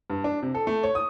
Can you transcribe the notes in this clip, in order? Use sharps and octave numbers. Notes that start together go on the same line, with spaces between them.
G2
D4
C3
A4
A3
C#5
D#6